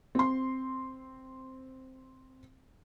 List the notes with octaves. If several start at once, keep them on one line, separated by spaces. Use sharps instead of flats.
C4 C6